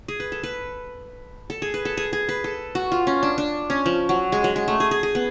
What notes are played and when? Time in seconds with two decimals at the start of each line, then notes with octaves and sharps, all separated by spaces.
0.08 G#4
0.20 B4
0.32 A4
0.44 B4
1.50 A4
1.62 G#4
1.74 B4
1.85 A4
1.97 G#4
2.13 G#4
2.29 B4
2.44 A4
2.75 F#4
2.92 F4
3.07 C#4
3.23 D4
3.38 D4
3.70 C#4
3.86 F3
4.09 F#3
4.32 G#3
4.44 F#3
4.56 G#3
4.68 A3
4.80 G#4
4.91 G#4
5.03 G#4
5.15 B3